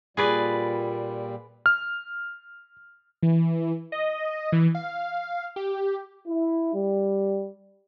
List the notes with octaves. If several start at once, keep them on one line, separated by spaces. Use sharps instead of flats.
A#2 G3 G#4 B4 D5
F6
E3
D#5
E3
F5
G4
E4
G3